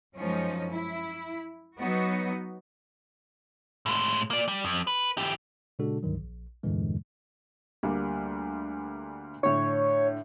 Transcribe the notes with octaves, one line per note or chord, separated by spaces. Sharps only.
F#2 F3 G#3 C#4 D#4
E4
F#3 B3 D#4 F#4
A2 G#3
A#3 D5
G3
F2
B4
E3 G4
A#2 C#3 G#3 D4 F#4 A4
C#2 G2 D3 D#3 F#3
A#1
E2 G2 A#2 D3 E3 G#3
D2 G3 A#3
A2 D3 C#5